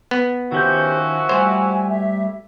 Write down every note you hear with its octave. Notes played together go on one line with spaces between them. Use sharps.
B3
D#3 F3 C#4 E4 F#4 G4 C5 G6
G3 A3 C5 C#5 G#5
E5